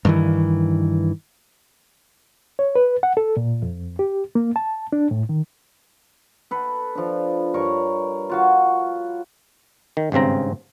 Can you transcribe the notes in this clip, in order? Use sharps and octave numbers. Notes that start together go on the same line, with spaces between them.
G2 D#3 E3
C#5
B4
F#5
A4
A#2
F2
G4
A#3
A5
D4
A2
D#3
A4 B4
F3 D4
G2 A#4 C#5 C#6
F4 F#4 F5
D#3
G#1 G2 C#3 C4 A#5